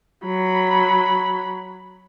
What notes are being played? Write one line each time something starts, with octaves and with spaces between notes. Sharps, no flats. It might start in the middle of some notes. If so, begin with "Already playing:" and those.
F#3 B5